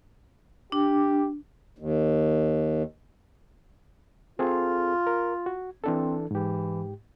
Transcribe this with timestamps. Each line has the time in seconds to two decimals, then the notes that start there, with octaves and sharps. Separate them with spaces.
0.72 D4 G4
1.78 D#2
4.39 C4 F4 G#4 A4
5.07 A#4
5.46 F#4
5.84 E3 C4 D4 A4
6.31 G#2 E3 G4